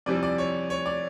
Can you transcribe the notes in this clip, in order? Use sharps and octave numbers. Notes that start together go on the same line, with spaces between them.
F2 C3 E3 G3 D5
D5
C#5
C#5
D5